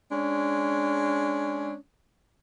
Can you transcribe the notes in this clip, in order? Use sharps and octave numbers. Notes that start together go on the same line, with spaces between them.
G#3 C#4 D4